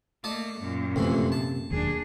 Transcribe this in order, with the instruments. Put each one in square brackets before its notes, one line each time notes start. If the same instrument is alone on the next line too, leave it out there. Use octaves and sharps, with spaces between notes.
[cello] A3 A#3 [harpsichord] D5 D#5 A5
[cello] F#2 A#2
[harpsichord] F2 A2 E3 [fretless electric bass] C3
[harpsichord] A5
[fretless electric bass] E1 D#2 F#3 [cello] D4 G#4